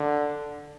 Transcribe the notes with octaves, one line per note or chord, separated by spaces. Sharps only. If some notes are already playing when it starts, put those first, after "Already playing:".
Already playing: D3